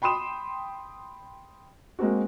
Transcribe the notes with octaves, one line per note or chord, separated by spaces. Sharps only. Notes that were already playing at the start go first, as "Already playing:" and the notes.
G5 B5 C6 D#6 E7
G#3 A#3 C4 F#4